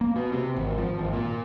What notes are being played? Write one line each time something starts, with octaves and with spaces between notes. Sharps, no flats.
A#3
B2
C3
G#1
F3
G#1
A#2